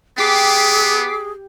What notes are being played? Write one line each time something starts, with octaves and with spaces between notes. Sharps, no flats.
B3 G4 G#4 D6 B6 C7